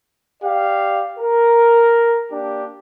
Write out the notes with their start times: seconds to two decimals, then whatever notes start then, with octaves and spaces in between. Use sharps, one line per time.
0.43 G4 D5 F5
1.18 A#4
2.31 A#3 D4 G4